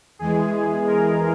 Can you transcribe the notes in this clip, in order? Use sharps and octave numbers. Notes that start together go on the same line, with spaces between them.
E2 E3 G#3 G#4
A#4